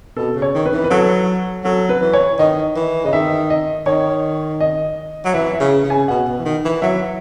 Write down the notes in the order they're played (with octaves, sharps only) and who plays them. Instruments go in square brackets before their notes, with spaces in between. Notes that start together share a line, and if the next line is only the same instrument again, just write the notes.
[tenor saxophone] B2 [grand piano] A4
[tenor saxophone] C#3
[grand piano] C#5
[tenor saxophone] D#3
[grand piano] B4
[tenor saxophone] E3
[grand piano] B4
[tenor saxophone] F#3 [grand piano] A4
[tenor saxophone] F#3 [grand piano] A4
[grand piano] B4
[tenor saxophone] E3
[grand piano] C#5
[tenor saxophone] D#3 [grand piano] D#5
[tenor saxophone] E3
[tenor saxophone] C#3 [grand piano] D#5
[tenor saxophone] D#3 [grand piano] E5
[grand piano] D#5
[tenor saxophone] D#3 [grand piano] C#5
[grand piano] D#5
[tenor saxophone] F#3
[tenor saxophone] E3 [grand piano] E5
[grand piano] E5
[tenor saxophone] C#3
C#3
[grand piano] G#5
[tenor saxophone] B2 [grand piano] F#5
[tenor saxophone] B2
E3
D#3
E3
[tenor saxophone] F#3 [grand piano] E5